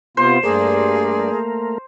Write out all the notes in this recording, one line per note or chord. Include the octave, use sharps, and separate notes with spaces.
C3 B3 F4 C5
G2 A3 A#3 G#4 A#4 D5